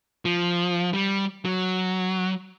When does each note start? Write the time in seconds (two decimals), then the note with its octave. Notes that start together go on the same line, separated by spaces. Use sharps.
0.25 F3
0.93 G3
1.45 F#3